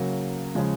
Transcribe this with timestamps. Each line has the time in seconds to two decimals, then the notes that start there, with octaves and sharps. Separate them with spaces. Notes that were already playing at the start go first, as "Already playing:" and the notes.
Already playing: C#3 F#3 A#3
0.55 C#3 F3 G#3